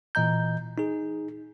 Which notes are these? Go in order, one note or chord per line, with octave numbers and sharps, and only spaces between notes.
A#2 E3 D#5 A#5 G6
D#4 G#4